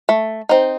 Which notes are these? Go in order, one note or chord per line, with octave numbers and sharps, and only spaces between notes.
A3
C4 D#4